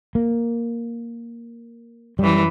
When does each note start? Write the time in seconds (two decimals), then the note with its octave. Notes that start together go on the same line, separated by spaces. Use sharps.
0.15 A#3
2.19 F#2 E3 G3